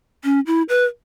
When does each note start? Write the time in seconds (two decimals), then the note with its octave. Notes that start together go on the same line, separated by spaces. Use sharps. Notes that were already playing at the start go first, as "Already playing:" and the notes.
0.24 C#4
0.47 E4
0.69 B4